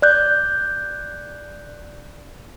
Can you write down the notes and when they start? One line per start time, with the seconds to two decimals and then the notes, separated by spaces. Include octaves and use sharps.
0.02 D5 F#6 G6